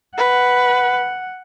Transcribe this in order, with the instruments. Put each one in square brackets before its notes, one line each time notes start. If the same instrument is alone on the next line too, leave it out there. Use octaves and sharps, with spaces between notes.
[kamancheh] B4 [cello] F#5